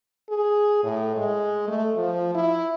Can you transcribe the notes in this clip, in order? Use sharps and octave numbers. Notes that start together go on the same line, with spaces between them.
G#4
A2
G#3
A3
F3
E4